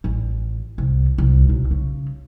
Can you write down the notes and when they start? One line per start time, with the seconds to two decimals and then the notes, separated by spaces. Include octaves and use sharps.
0.04 A1
0.78 C2
1.18 C2
1.49 B1
1.71 C#3